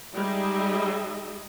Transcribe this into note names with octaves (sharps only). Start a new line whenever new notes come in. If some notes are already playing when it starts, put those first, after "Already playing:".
G3 G#3 D#4 G#4 D#5 E5